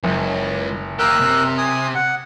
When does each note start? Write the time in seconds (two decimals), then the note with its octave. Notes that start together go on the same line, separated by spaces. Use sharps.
0.04 F#1 C#2
0.99 A#3 G4 A#4 E6 F#6
1.21 C3
1.58 G#5 D#6
1.95 F#5